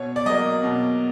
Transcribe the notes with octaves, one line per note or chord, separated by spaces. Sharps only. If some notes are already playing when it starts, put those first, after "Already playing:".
Already playing: B2 C#5
D5
F#3 A#3 D#5
B2